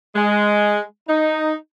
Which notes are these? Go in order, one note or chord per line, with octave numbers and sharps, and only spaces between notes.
G#3
D#4